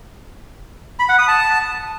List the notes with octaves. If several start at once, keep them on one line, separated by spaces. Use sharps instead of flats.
B5
F#5
D#6
A5